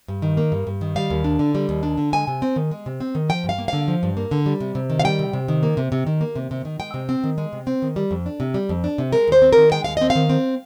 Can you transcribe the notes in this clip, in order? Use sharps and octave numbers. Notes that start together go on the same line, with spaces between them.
G2
D#3
A#3
G2
G2
D#3
G3 F5
D#2
D4
D3
G3
D#2
D4
D3
G#3 G#5
C3
C4
D#3
G#3
C3
C4
D#3
F3 G5
G2
F5
A#3
D3 F5
F3
G2
A#3
D3
G3
C3
C3
D#3
F5
G3 G5
C3
C3
D#3
A#3
C3
C3
D#3
A#3
C3
C3
D#3
G#3 G5
C3
C4
D#3
G#3
C3
C4
D#3
G3
F2
D4
C3
G3
F2
D4
C3
G#3 A#4
D#2 C5
C4
D#3 A#4
G#3 G5
D#2 F5
C4 D#5
F5
D#3
C4